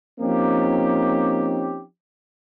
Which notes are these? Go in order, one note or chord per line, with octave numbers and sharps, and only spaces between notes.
F3 A#3 C4 C#4 D#4 G4